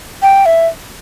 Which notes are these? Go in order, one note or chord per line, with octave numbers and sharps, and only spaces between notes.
G5
E5